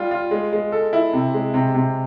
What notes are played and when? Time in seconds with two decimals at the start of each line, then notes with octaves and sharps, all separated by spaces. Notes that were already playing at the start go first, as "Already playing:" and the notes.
Already playing: G3 F4
0.11 F4
0.31 G#3
0.53 G#3
0.72 A4
0.93 E4
1.13 C3
1.34 G#3
1.54 C3
1.75 C3